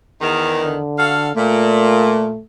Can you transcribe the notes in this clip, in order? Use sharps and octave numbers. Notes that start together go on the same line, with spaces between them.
E2 D#3
D3
F#4 A4 F5
A#2 A3